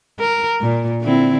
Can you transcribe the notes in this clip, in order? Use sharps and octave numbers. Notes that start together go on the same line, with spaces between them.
A#4
A#2
D3 C4 E4